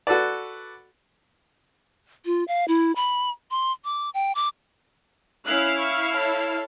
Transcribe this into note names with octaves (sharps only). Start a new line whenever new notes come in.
F#4 A4 B4 D5
F4
F5
E4
B5
C6
D6
G5
D6
C#4 E4 F5 F#6
C#6
A4 C#5